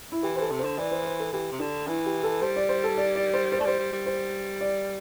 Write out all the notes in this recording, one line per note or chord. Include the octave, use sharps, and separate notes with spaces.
E4
E3 G4
E3 A4 C5
C3
D3 C5
E3 D5
C5
C5
A4
E3 G4
C3
D3 D4
E3 E4
G4
A4
G3 C5
D5
C5
A4
D5
D5
C5
C5
A3 D5
G3 C5
G3
G3
C5
D5